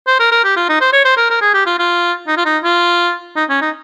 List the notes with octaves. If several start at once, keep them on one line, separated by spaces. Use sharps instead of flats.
C5
A#4
A#4
G4
F4
D#4
C5
C#5
C5
A#4
A#4
G#4
G4
F4
F4
D#4
F4
D#4
F4
D#4
C#4
D#4